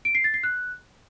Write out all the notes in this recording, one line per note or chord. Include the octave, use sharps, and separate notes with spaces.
D7
C7
A6
C7
F#6